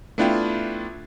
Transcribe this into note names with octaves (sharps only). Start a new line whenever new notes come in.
A3 B3 D4 E4 F4 G5